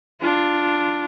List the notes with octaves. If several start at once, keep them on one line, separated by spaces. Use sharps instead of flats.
D4 F4